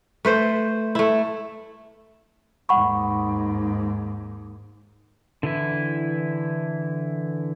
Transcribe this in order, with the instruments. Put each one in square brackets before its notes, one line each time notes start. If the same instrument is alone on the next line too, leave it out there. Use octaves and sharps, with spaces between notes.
[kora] A3 B4 C5
A3 E4
[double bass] D#2 G#2 [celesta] F#5 B5 C#6
[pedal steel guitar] D3 E3 E4